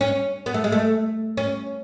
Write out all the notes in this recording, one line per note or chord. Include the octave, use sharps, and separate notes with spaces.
C#4
B3
A3
G#3
A3
C#4